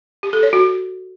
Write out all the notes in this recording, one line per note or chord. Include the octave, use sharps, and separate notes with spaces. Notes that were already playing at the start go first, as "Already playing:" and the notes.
G4
A4
C#5
F#4